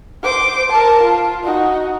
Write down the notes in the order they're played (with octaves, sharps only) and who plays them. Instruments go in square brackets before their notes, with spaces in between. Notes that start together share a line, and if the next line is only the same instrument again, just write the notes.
[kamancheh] C5 D6
A#4 A5
F4
D#4 F#4